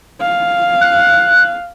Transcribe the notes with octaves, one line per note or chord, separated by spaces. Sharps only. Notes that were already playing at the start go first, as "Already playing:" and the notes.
F5
F#6